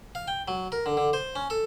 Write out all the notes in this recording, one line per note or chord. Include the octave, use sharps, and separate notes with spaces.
F5
G5
F#3
A#4
D3
D3
C5
C#4
A4